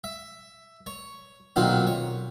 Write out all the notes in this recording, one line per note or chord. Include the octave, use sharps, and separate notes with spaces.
E5
C#5
B1 A#2 D#3 C4 F#5
C#5